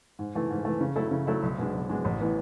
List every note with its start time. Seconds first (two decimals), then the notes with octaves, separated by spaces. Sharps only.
0.19 G#2
0.35 E3 A3
0.50 G#2
0.65 E3 A3
0.81 C#3
0.96 F#3 A3 E4 A4
1.11 C#3
1.27 F#3 A3 E4 A4
1.43 B1
1.58 B2 G#3 D4
1.74 B1
1.89 B2 G#3 D4
2.05 A1
2.20 A2 E3 B3